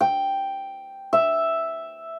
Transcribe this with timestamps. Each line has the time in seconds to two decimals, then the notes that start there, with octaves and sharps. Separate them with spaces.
0.01 G5
1.13 E5